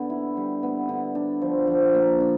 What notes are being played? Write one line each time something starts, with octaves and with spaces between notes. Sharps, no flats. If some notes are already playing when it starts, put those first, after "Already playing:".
Already playing: D3 B3
E4
G3
B3
D3
D4
F3
F3
A#3
D4